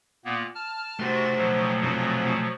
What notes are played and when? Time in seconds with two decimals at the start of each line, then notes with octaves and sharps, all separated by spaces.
0.25 A#2 A#3 B3
0.55 A5 F6
1.00 C3 A3 F#4 C5 A6
1.37 B2 F3 F#3
1.83 C3 A3